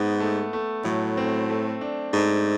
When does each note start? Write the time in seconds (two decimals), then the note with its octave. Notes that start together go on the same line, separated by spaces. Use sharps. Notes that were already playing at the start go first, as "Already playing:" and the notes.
Already playing: G#2 B3
0.20 A3
0.53 A3
0.85 A2 F#3
1.17 C4
1.49 A3
1.81 D4
2.14 G#2 A3